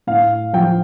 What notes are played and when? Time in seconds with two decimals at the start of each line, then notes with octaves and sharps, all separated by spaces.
0.07 A2 F5
0.53 F3 G5